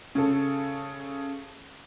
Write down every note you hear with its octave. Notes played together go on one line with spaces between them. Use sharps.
C#3 A4